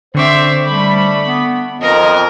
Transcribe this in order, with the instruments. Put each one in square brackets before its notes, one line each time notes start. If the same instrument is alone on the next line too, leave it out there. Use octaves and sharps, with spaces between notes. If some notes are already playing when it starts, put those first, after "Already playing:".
[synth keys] D3 C#6 D6 [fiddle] C4 E5 [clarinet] C5
[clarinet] G3 [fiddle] A3 B5
[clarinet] B3
[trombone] F2 [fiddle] A#4 [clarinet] D#5